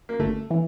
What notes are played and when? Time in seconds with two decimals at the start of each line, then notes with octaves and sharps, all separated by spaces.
0.09 A#3
0.19 G1 A3
0.51 E3